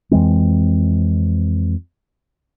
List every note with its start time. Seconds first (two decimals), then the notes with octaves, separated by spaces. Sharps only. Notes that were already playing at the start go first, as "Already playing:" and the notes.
0.11 F2 E3 G#3 C4